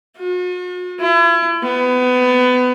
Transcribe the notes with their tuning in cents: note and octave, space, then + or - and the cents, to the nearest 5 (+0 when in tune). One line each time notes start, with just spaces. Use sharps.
F#4 -45
E4 +40
B3 +25